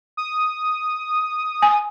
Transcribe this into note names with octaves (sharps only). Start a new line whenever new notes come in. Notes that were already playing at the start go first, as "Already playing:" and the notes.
D#6
G#5